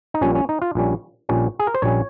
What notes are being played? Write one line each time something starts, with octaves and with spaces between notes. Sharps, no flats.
D#4
A#1 A#2 G3 C#4
C#4
D#4
F4
A#1 A#2 G3 C#4
A#1 A#2 G3 C#4
G#4
A#4
C5
A#1 A#2 G3 C#4 C#5